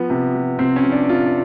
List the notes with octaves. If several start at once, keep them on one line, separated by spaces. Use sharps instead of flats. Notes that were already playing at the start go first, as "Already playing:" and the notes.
Already playing: F3 B3
C3
F3
C3 C4
C#4
F3
D4
C3 F4